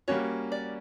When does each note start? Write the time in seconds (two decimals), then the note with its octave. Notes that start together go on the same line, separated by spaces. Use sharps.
0.08 G3 A#3 C#4 F#4 C#5
0.52 D5